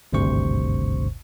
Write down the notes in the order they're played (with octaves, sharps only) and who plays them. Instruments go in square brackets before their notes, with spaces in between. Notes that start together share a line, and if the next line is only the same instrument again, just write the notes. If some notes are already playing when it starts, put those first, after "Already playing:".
[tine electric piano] G#1 D2 G2 C3 C5 C#6